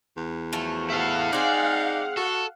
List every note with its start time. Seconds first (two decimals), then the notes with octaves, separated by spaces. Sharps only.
0.17 E2
0.53 F3 F#3 A3
0.90 E4 A4 F5 F#5
1.33 C4 D#4 G#4 D5
2.17 F#4 A4